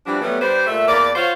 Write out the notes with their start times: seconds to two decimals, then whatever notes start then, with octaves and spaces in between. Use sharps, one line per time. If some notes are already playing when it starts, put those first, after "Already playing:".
0.07 E3 F3 G3 D4 F#4
0.22 F#3 G3 A3 B3
0.41 G3 D4 B4 C5
0.66 A#2 A3 E5
0.88 E2 A#3 D5
1.15 F4 F#4 C5 C#5 F5